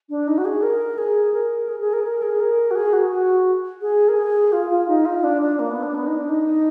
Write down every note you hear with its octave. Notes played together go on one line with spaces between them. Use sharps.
D4
D#4
F#4
G#4
A#4
G#4
A#4
G#4
G#4
A#4
A#4
G#4
A#4
F#4
G#4
F#4
F#4
G#4
A#4
G#4
F4
F4
D#4
F4
D4
D4
A#3
B3
D4
B3
D#4
D4
D#4